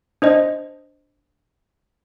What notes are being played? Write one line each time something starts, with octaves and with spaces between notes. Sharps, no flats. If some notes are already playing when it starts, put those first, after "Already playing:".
D4 C5 D#5